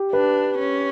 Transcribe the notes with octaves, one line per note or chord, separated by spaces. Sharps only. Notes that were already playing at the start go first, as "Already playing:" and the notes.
Already playing: G4
D4 B4
C#4